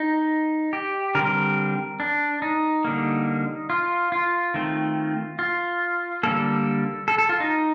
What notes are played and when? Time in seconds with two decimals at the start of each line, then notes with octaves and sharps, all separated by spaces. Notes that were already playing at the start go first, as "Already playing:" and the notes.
Already playing: D#4
0.73 G4
1.15 D3 G3 C4 A#4
2.00 D4
2.42 D#4
2.84 D3 G3 A#3
3.70 F4
4.12 F4
4.54 D#3 A3 C4
5.39 F4
6.23 D3 G3 A#3 A4
7.08 A4
7.18 A4
7.29 F4
7.40 D#4